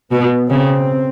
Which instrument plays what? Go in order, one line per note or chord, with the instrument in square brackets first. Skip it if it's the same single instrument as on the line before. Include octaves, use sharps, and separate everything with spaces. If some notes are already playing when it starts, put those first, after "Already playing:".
[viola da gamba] B2 [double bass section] B3
[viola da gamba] C#3 [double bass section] C4